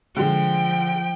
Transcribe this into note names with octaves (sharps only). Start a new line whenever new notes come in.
D3 F3 G#3 G5